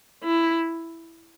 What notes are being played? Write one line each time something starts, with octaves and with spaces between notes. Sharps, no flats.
E4